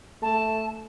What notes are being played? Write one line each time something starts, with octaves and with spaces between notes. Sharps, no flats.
A3 A5